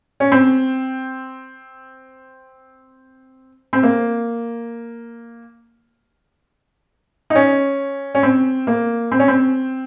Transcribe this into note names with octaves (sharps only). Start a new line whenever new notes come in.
C#4
C4
C4
A#3
D#4
C#4
C#4
C4
A#3
C4
C#4
C4